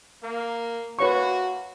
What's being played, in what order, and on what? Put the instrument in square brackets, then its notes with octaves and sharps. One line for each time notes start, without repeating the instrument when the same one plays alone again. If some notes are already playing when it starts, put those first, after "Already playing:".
[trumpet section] A#3
[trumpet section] A#3 F#4 [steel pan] B4 C#5 C#6